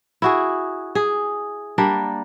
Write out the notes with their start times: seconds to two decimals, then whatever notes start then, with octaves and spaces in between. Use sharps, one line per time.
0.22 E4 F#4 G#4
0.95 G#4
1.78 G3 A#3 D4